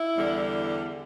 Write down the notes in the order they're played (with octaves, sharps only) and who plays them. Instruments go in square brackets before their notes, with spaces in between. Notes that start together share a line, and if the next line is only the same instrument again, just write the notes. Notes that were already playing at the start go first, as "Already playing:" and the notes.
Already playing: [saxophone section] E4
E2 D3 G3